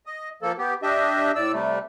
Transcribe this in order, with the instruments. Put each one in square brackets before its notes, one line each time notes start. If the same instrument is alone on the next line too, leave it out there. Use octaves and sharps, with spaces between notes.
[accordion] D#5
F3 A#3 A4
B3 G4
D4 G4 D#5 E5
A2 D5 E6
C3 G3 A3